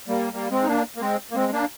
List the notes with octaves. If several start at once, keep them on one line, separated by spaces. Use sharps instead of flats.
G3 A#3
G3 A#3
G#3 C4
D#4
A#3 D4
A#3
G#3 C4
A#3
G#3 C4
A#3 D4